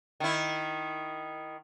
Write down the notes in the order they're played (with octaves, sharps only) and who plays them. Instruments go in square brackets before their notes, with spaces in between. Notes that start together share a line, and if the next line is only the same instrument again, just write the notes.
[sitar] D#3 E4